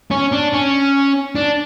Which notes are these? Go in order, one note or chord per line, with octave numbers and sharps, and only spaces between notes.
C#4
D4
C#4
D4